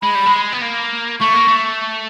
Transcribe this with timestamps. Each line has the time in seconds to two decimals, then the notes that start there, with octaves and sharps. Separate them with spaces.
0.02 G#3 B5
0.15 G3
0.26 G#3
0.53 B3
0.62 A#3
1.20 A3 C#6
1.34 A#3
1.48 A3